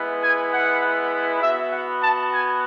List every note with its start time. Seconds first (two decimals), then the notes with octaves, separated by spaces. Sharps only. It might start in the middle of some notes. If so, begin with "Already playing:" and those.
Already playing: G#3 B3 E4
0.22 G#5
0.52 F#5
1.42 B3 F#4 E5
1.71 F#5
2.01 A5
2.32 G#5